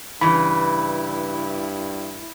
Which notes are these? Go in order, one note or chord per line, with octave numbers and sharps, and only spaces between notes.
G2 C#3 E3 E4 B5